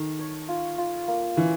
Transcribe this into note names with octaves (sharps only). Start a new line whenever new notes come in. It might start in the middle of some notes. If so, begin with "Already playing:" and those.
Already playing: D#3 A4
C#5
F4
F4
A#3
E3 C#4